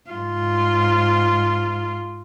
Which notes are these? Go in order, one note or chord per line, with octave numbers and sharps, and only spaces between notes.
G#2 F4